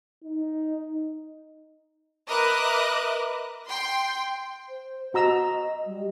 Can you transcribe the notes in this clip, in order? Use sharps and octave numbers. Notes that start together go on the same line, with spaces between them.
D#4
A#4 B4 D#5 E5 D6 F#6
G5 C6
C5
F#4 D#5 A#5 E6
G3